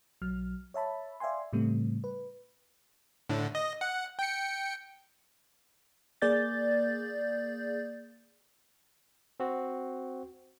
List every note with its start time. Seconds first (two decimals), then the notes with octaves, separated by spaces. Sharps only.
0.22 B1 F#3 F6
0.74 C#5 E5 A5 B5
1.20 D5 E5 F5 G5 G#5 C6
1.53 A2 C#3 G3 A3 C4
2.04 B4
3.29 A2 D3
3.55 D#5
3.81 F#5
4.19 G5 C#7
6.22 A#3 G#4 D5 G6 A6
9.40 C4 F#4